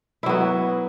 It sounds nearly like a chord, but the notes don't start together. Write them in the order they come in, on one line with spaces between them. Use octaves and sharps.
E4 F#3 B3